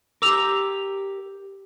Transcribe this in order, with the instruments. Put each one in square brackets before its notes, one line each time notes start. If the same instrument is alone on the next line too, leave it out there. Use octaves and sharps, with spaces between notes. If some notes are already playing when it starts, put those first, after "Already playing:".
[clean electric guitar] G4 A#4 [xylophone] D6 E6 F7